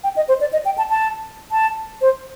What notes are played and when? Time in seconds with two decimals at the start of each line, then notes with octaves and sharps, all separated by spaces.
0.04 G5
0.16 D#5
0.28 C5
0.41 D5
0.53 D#5
0.65 G5
0.78 A5
0.90 A5
1.52 A5
2.01 C5